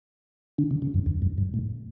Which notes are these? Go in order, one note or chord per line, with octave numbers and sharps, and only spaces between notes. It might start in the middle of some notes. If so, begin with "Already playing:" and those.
D3
C#3
C#3
F#2
E2
F#2
G2
A2